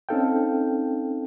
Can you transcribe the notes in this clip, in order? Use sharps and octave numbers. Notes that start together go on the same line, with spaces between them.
C4 C#4 D#4 A4 F5 G5